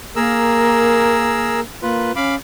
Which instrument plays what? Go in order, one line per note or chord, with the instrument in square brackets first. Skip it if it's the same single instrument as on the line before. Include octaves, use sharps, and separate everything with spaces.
[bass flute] A#3 [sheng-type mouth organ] G#4 A#4 E6
[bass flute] A#3 [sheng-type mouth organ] F4 B4
[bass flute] C#4 [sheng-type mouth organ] F5 B5 D6